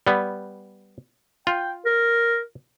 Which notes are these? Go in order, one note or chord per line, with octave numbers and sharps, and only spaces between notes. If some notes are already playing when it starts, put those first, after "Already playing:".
G3 B3
F4 G5
A#4